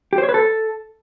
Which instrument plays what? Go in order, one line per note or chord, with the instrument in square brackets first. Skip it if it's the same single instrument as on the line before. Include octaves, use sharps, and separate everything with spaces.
[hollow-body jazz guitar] G4
C5
C#5
B4
A4